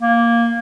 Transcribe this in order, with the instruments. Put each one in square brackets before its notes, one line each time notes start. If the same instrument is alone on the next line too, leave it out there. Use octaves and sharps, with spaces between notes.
[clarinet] A#3